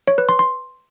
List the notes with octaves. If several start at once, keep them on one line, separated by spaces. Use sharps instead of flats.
C#5
B4
C6
C6